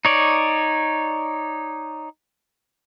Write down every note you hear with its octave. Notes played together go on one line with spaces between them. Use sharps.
D#4 C#5 D5